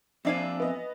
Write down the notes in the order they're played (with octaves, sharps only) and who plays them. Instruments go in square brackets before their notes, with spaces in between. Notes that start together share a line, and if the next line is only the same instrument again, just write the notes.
[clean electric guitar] F2 D5 [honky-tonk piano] C4 D4 [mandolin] E5 F5 G#5
[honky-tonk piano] B3 D#5